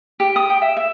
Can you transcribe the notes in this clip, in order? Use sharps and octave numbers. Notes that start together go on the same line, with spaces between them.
G4
D#6
G5
E5
E5